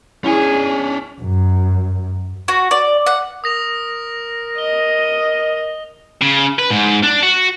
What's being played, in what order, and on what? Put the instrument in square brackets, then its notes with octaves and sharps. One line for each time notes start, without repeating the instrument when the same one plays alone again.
[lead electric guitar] C#4 D4 [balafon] E4 [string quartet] G#4 G#5
[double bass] F#2
[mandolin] F#4
D5
F#5
[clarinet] A#4 [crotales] D#6 A#6 F7
[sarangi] D#5 [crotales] G7
[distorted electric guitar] C#3
B4
G#2
D4
F#4